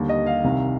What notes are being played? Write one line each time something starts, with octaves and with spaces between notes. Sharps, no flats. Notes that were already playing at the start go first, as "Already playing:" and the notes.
Already playing: D#2 D3 G3
D#5
F5
C2 C3 D#3